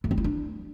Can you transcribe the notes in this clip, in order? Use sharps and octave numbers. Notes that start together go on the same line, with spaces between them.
A3
C4
E4
D4